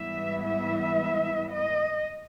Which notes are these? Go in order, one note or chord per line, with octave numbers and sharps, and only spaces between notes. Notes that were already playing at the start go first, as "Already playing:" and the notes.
Already playing: G#2 E3 G3 B3 E4 E5
E5
D#5